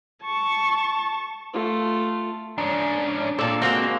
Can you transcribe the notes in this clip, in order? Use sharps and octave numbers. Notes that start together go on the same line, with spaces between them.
A5 C#6
A3 F4
G#2 C#4 D4
A#2 A4 C5 D5
G#3 A#3 C4 F#4